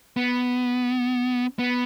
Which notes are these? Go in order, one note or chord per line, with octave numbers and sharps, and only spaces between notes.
B3
B3